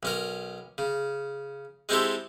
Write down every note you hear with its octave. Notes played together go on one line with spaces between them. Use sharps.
B1 C#4 A#4
C#3
G#3 C4 D#4 E4 G4 A4